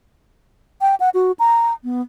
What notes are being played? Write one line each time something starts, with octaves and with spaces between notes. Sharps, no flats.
G5
F#5
F#4
A#5
B3